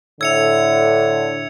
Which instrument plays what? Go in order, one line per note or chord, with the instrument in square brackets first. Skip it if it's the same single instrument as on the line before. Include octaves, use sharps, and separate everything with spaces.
[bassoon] A2 [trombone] D3 [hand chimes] E5 E6 [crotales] G#6 C#7 F7